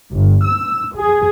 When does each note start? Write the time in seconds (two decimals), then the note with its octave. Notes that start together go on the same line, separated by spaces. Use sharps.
0.11 G1
0.44 E6
0.95 G#4